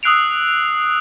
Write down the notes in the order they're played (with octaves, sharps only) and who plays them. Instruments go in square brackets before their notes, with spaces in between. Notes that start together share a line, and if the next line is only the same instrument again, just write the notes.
[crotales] D#6 E6 F#6 C7 D7 F7